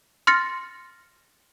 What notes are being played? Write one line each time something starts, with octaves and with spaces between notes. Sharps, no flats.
C6 F6 A6 A#6 C#7